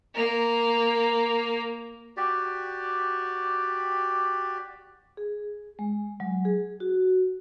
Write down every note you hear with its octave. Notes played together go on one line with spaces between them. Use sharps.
A#3 A#4
F#4 G4 D5
G#4
G#3
F#3
G#4
F#4